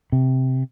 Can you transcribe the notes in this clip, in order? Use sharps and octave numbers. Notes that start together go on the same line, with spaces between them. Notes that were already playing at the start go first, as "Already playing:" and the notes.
C3